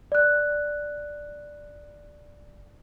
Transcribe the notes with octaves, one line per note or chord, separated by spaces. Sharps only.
D5 F#6